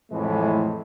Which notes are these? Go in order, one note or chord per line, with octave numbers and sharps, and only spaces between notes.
F2 A2 E3 G#3 A3